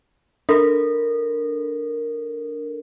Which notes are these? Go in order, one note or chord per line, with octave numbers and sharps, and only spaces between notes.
D4 A4 A#4